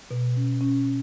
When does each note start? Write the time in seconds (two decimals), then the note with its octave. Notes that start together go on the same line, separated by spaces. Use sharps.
0.11 B2
0.36 C#4
0.61 C#4
0.86 C#4